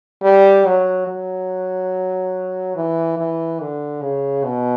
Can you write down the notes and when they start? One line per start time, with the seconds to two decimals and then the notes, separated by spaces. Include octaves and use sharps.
0.23 G3
0.65 F#3
1.08 F#3
2.76 E3
3.18 E3
3.60 D3
4.02 C#3
4.44 B2